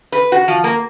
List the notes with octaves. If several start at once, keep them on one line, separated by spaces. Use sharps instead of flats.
B4
F#4
F3
A#3